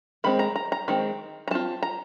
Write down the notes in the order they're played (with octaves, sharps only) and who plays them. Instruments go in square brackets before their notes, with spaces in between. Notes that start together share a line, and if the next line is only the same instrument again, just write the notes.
[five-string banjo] D#3 G#3 C4 B5
A#5
A#5
A#5
D#3 G#3 C4
A#5
G3 C4 F4 A5
A#5